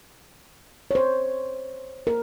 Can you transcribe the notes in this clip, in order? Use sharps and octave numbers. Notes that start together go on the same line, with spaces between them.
C#5
C5
A#4